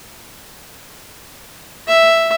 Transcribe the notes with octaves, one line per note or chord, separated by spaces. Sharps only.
E5